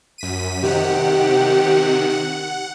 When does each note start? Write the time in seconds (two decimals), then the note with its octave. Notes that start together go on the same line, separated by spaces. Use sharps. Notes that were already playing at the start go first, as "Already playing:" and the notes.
0.18 F#2 B6 D#7
0.62 C3 D#3 G4 F#5
2.10 F#5